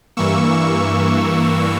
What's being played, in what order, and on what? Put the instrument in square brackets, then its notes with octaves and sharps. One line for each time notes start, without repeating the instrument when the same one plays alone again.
[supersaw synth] G2 E3 A#3 C#6 E6